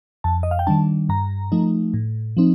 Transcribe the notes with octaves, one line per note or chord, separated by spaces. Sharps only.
F2 A5
D#5
F5
G5
D#3 G3 D4 A5
G2 A#5
F3 A3 D#4
A2
F3 C4 D#4